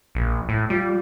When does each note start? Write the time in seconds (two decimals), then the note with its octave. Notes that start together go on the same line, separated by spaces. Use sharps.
0.15 A#1
0.49 A2
0.70 G3 F4